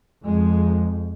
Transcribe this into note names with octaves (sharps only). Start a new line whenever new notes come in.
F2 G#3